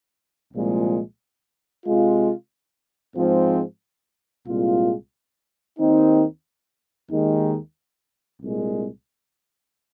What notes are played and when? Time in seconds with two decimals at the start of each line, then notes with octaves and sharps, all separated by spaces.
0.54 C2 A#2 F3 G#3
1.86 C3 G#3 F4
3.16 G#2 F3 G#3 C4 F4
4.47 C2 A#2 G#3 F4
5.79 D#2 D#3 C4 D#4
7.10 D#2 D#3 G#3 D#4
8.41 C2 A#2 G#3